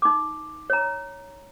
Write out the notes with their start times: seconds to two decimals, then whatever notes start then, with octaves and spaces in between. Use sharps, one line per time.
0.02 D#4 D6
0.70 C#5 A#5